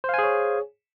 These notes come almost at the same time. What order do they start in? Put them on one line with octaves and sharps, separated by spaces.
C5 F5 G#5 G#4 C#5